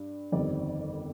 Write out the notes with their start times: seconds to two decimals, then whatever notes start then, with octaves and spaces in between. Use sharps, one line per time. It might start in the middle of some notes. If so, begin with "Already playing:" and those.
Already playing: G2
0.32 G1 F2 D#3 G3 C4 D5